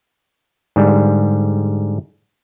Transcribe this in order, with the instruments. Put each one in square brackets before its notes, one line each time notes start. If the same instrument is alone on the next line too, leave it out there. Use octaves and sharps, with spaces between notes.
[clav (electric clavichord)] G#2 D3 G3